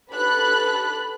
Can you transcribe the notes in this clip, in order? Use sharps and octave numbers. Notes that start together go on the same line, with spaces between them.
G4 A4 B4 B5 F#6